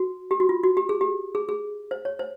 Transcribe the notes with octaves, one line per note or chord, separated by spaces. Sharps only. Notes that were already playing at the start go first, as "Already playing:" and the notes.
Already playing: F#4
G4
F#4
F4
F#4
G4
G#4
G4
G#4
G#4
C5
C#5
C5